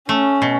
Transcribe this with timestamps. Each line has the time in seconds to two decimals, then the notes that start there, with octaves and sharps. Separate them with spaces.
0.09 A3 C#4
0.42 B2